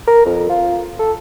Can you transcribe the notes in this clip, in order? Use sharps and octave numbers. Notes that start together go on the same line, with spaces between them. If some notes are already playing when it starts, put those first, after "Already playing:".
A#4
F2
F4
A4